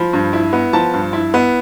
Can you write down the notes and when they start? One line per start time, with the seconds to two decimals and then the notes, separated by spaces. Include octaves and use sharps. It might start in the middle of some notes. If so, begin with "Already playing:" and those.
Already playing: F3 B5
0.13 G2
0.33 E4
0.53 B3
0.73 F3 A5
0.93 G2
1.13 E4
1.34 B3